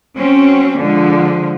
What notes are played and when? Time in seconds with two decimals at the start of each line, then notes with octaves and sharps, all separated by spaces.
0.18 F#3 C4 C#4
0.80 D3 F3 G#3